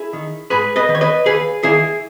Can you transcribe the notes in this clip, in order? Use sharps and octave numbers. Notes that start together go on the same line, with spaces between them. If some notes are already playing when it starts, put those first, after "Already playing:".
Already playing: E4 G#4
D#3
G#2 G#4 B4
B4 D#5
D#3
C#5
B4 D#5
D#2 G#4 B4
D#3 E4 G#4